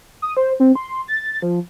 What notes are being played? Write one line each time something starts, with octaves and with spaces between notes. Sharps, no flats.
D#6
C5
C4
C6
A6
F3